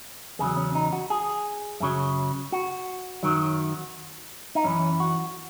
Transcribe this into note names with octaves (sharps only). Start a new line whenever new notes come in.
E2 C#3 F#3 G#4
C#4
D#4
F#4
G#4
F#2 C#3 F#3
F#4
F#2 D#3 F#3
D#4
F#2 E3 C#4
F#4